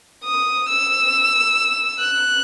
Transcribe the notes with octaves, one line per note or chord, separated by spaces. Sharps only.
D#6
E6
F#6